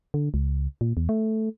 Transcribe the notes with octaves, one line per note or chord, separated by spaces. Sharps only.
D3
C#2
A#2
E2
A3